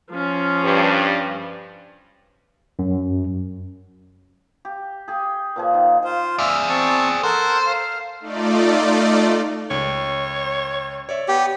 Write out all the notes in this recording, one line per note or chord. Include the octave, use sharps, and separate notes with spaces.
F3 C#4
G2
F#2
G4
G4 G#4
A#2 F3 G#4
D#3
F4 C5
G#4 D5 E5 F6
C4 A5 C#6
A4 A#4 C5 F#5
F5
A3 D#4 F4 D5
C#2 C#5
C#5 D5 E5
B3 G4